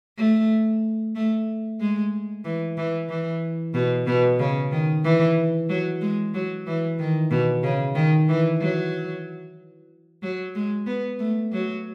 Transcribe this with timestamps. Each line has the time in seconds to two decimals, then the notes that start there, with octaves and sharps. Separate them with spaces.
0.18 A3
1.15 A3
1.80 G#3
2.45 E3
2.77 E3
3.09 E3
3.74 B2
4.07 B2
4.39 C#3
4.72 D#3
5.04 E3
5.69 F#3
6.01 G#3
6.34 F#3
6.66 E3
6.99 D#3
7.31 B2
7.63 C#3
7.95 D#3
8.28 E3
8.60 F#3
10.23 F#3
10.55 G#3
10.87 B3
11.19 A3
11.52 F#3